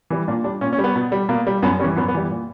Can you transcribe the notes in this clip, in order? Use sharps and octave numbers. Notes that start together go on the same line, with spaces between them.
E3 G3
A#2 D4
G3 D4
A#2 C#4
C#4
G3
B3
B2
G3
B2 A#3
G3
F#2 B3
E3 G3 C#4
F#2 B3
B3
E3 G3
A#2